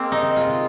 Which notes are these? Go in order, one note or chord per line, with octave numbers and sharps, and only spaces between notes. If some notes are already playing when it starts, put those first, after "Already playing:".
Already playing: G#3 A#3 C4
C3 D#4
G#3 F4